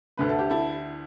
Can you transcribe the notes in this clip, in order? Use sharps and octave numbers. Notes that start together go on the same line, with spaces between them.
D2 D3 A3 B4
A4
G4
E4 A4